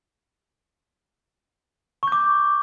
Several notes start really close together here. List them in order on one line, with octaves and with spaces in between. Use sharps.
C#6 G6 D6